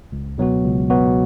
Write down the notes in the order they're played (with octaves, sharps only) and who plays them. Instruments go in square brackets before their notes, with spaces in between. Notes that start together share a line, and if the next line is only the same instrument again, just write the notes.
[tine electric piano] C#2
B2 F#3 B3 F#4
C#2
B2 F#3 B3 F#4